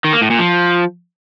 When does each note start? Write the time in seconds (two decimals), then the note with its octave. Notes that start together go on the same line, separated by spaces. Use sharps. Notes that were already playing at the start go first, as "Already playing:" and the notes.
0.04 D#3
0.13 A#3
0.22 A2
0.30 A#2
0.39 F3